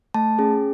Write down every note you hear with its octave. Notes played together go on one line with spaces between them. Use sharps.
A3 A5
C#4 G#4